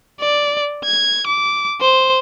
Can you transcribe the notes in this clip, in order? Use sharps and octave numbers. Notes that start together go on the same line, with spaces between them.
D5
G#6
D6
C5